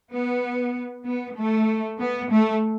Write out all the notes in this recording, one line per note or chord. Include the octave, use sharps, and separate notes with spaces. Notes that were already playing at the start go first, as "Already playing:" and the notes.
B3
B3
A3
B3
A3